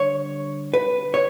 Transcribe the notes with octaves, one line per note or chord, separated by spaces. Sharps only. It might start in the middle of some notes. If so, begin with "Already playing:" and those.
Already playing: D3 G3 C#5
B4
C#5